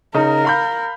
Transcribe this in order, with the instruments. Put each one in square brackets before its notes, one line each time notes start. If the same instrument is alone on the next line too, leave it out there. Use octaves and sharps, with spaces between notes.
[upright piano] C#3 D#4 [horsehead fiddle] A#4
[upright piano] F5 B5 G6